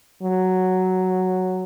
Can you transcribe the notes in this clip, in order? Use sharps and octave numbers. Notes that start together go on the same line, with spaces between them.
F#3